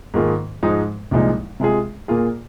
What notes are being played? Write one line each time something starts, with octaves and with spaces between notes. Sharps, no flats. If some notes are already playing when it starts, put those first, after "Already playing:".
G#2 D#3 A#3 F4 G#4
G#2 F3 G#3 D#4 G#4
C2 A#2 F3 G#3 D#4
C3 G#3 F4 G#4
A#2 A#3 F4 G#4